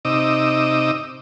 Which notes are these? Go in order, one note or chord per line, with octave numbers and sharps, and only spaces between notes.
C3 D#4 D#5 D6 E6